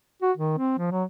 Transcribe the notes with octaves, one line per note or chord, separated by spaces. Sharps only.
F#4
D#3
C4
F3
F#3